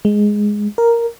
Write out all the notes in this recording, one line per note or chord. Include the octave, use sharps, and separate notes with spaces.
G#3
A#4